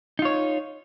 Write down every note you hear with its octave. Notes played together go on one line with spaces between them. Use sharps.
D#4 F4 C#5